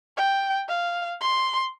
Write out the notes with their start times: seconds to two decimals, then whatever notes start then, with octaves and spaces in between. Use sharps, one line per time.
0.17 G5
0.69 F5
1.21 C6